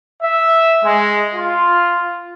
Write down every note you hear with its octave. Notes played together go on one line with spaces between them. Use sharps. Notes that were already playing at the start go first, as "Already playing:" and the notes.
E5
G#3
F4